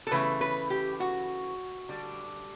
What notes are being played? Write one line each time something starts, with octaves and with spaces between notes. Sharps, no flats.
A4
C#3 E3 A3 B4
B4
G4
F#4
D3 G3 D4